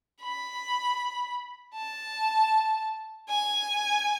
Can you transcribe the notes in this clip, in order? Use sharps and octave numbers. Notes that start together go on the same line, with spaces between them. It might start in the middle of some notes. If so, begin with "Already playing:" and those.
B5
A5
G#5